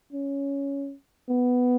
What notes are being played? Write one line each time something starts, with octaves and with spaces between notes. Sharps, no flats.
C#4
B3